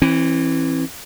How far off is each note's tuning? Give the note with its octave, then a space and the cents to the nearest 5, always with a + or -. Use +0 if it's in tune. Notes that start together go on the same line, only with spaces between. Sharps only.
E3 +0 C4 +40